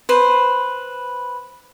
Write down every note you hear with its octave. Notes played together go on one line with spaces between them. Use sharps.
B4 C5